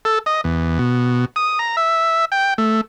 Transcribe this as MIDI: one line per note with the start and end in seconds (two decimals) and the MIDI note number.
0.05 0.19 69
0.26 0.41 75
0.44 0.78 40
0.79 1.25 47
1.36 1.59 87
1.59 1.76 82
1.77 2.25 76
2.32 2.54 79
2.58 2.81 57